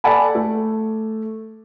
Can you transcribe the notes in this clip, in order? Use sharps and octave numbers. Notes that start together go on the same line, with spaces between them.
A4 D5 F#5 G#5 B5
A3